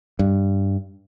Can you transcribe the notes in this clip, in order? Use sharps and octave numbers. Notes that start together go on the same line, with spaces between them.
G2